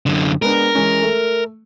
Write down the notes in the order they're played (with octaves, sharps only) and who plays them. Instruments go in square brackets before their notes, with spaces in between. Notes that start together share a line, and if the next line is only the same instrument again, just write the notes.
[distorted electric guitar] F#2 D3
[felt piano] G#3 B3 D4 [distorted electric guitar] A#4
[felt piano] E3 G#3 C#4
A3